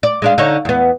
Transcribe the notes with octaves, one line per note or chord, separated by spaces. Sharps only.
D5
G#3 D4 F5
D3 D#4 C#5
E2 B3